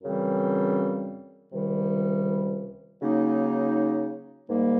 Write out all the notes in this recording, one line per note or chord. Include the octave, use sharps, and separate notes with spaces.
F#2 C#3 E3 G3 C4
C#2 C3 D#3 G3
C#3 F#3 A#3 D#4
G#2 D#3 G3 A#3